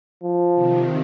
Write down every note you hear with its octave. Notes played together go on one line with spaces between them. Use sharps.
F3
C3 D#3